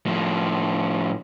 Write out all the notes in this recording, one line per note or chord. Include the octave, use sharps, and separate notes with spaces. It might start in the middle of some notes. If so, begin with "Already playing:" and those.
A2 F3